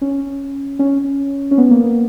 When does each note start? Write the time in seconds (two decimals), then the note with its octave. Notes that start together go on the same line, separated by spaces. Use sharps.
0.01 C#4
0.79 C#4
1.51 C#4
1.58 B3
1.71 A#3
1.84 B3